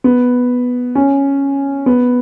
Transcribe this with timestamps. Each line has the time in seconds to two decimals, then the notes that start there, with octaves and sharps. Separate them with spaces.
0.04 B3
0.95 C#4
1.86 B3